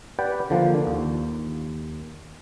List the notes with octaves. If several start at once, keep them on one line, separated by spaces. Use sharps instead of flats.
G4 B4 D5 F#5 G5
D3 F3 A#3
D#2